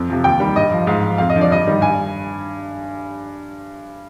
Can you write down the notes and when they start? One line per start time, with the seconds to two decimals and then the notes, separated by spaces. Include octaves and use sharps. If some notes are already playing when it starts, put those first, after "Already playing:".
Already playing: F2
0.10 C3 F3
0.24 D#2 G5
0.40 D#3 G3
0.56 G2 D#5
0.72 F3
0.87 G#2 F5
1.03 F3
1.18 F2 F5
1.30 D#5
1.35 D3 F3
1.41 D5
1.51 G2 D#5
1.66 D#3 G3
1.81 G2 G#5